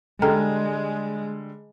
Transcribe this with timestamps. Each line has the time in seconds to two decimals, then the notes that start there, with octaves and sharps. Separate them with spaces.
0.22 D3 G3 G#3 A4 G5 A#5 F6